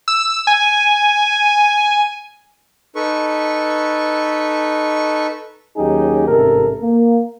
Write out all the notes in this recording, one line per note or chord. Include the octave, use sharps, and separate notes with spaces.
E6
G#5
D#4 A4 B4 C#6
D#2 F#3 C#4 D#4 G4 G#4
A1 G#2 C3 A3 A4 A#4
A#3